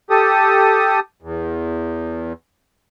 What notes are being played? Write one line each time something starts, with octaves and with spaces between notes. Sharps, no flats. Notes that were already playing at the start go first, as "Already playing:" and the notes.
G4 A4 D#6
E2